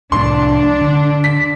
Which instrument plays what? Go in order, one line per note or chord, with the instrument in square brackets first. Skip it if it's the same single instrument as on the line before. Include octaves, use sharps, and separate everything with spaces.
[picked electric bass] C2 A2 [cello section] D4 [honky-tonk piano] C6
[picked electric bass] D3
[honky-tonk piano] B6